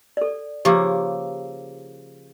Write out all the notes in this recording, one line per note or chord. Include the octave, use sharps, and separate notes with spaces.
A4 D5
C#3 F3 A#3 G4 D6 E6